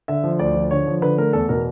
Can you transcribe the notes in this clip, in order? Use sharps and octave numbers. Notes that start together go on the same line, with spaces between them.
D3 E5
F3
D2 D5
F3
D3 C#5
F3
D3 B4
A3 A#4
E2 A4
B2 A#4